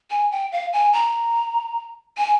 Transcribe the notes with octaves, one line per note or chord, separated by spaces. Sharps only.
G#5
G5
F5
G#5
A#5
G#5